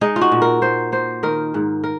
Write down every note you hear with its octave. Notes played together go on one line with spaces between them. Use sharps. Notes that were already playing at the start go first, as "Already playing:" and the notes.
G#3 D#4
F4
F#4
A#2
A#4
A#2 C5
A#3 C5
D#3 A#4
G#2
A#4